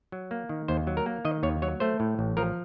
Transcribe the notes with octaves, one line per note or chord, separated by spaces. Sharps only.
F#3
A#3
D#3
D#2 C5
F#3
A#4
A#3
D#3 D#5
D#2 C#5
F#3 C#5
A3 C5
A2
A1
F3 A#4